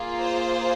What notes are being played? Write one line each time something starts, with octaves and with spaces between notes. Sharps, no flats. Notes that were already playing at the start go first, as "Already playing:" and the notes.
Already playing: A#3 F4 G#4
C5